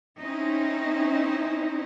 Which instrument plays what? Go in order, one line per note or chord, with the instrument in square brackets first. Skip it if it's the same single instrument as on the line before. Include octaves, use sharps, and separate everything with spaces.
[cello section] C4 C#4 D#4 E4